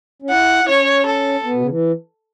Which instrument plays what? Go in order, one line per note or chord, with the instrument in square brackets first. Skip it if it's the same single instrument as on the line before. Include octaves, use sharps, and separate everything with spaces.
[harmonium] C#4
[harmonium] E4 [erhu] F#5
[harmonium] E4
[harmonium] C#4 [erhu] C#5
[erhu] A4
[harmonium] B3
B2
C#3
E3